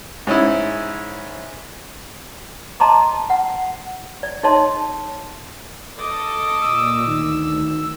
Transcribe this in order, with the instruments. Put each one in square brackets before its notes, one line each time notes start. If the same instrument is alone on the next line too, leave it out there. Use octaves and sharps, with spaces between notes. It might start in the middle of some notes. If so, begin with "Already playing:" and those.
[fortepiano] G#2 C#4 E4
[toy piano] D#5 A5 A#5 C6 D6
F#5
D5
D#4 G#4 C#5 D#5 A5 C6
[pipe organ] A4 [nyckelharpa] D#5 D6
[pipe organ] A#2 [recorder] E6
[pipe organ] D2 [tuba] D#3